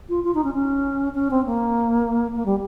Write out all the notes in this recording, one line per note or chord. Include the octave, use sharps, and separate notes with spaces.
F4
F4
D#4
C#4
C#4
C#4
C4
A#3
A#3
G3